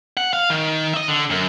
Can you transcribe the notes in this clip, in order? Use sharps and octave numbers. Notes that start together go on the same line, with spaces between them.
F#5
F5
D#3
D#5 E5
D3
F#2